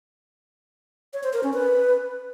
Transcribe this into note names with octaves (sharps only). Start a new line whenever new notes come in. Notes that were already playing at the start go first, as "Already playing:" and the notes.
C#5
C5
A#4
C#4
B4